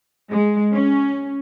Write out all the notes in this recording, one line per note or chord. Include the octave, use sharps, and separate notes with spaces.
G#3
C#4